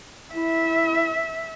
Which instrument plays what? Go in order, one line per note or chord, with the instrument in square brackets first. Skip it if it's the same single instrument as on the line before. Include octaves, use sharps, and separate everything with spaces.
[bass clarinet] E4 [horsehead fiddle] E5